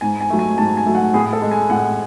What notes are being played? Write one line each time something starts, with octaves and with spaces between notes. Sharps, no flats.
G#2 G#5
G#5
F#3 A3
G#5
G#2 A5
G#5
F#3 A3
F#5
A2 G#4
A4
G#3
G#5
A2 F#5